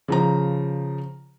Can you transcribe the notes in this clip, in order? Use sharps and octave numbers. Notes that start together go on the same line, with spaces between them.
C#3 F3 A#5